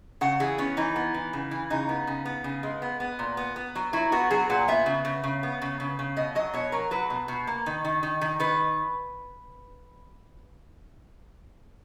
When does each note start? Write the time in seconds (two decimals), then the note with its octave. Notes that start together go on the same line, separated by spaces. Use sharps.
0.21 C#3 F#5
0.40 E3 G#4
0.58 B3 C#4
0.77 E3 D#4
0.96 B3
1.14 E3
1.33 C#3
1.51 E3
1.70 C#3 D#4
1.89 B3
2.07 C#3
2.25 B3
2.44 C#3
2.63 G#3
2.82 B3
3.00 B3
3.19 A#2
3.37 B3
3.56 B3
3.75 F#3
3.93 F#3 E4
4.12 B3 F#4
4.31 F#3 G#4
4.50 A#2 F#5
4.68 B3 E5
4.86 C#3
5.05 C#3
5.23 C#3
5.43 B3
5.62 C#3
5.80 C#3
5.99 C#3
6.16 B2 D#5
6.35 F#3 D#5
6.53 B2 C#5
6.72 F#3 A#4
6.91 F#3 B4
7.10 B2
7.28 B2
7.47 A#3
7.66 D#3
7.85 D#3
8.03 D#3
8.21 D#3
8.40 D#3 B4